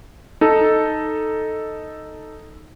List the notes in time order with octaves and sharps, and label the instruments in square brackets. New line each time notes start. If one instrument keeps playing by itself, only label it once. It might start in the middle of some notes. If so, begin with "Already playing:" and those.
[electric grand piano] D#4 A4